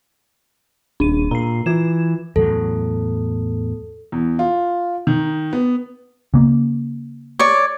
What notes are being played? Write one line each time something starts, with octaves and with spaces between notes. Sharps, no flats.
D#1 D4 D#7
A#2 A#5 C7
E3 F4 G#6 E7
E2 A2 F#3 A4
E2
F4
D#3
B3
C#3 A#3
C#5 D5